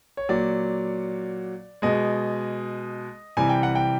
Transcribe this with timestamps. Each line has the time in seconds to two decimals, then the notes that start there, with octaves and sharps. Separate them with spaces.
0.17 C#5
0.29 A#2 F#3 D5
1.82 B2 G#3 D#5
3.37 C3 E3 G3 G#5
3.49 G5
3.63 F#5
3.75 G5